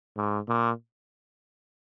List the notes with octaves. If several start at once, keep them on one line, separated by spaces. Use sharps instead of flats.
G#2
A#2